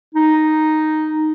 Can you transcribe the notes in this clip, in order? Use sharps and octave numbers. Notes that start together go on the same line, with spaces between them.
D#4